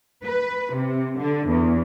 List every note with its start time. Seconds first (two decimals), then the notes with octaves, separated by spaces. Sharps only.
0.25 B4
0.74 C3
1.19 D3
1.49 E2